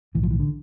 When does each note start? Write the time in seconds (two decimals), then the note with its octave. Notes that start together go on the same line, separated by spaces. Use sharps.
0.15 B1 A2 E3
0.23 F3
0.31 E3
0.40 D3